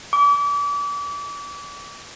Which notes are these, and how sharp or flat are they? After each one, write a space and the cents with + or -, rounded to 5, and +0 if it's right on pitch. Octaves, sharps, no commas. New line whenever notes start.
D6 -35